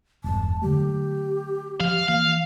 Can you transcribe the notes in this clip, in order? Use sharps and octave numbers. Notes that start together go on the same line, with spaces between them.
E1 G2 A5
D3 F#3 A3 G4
F3 F5
E3 A#3 F5